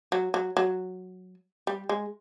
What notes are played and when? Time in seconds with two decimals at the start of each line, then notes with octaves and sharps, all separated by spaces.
0.12 F#3
0.34 F#3
0.57 F#3
1.67 G3
1.89 G#3